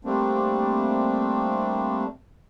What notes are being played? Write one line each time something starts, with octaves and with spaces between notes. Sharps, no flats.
G3 A3 A#3 C4 D4